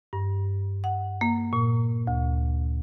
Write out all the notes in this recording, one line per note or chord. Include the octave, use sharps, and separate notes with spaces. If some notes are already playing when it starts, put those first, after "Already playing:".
G2
F#5
A#3
A#2
D2